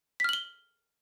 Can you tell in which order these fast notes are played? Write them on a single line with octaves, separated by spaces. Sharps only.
B6 F6 F#7 G7